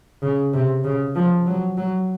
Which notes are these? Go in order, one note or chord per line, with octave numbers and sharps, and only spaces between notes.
C#3
C3
C#3
F3
F#3
F#3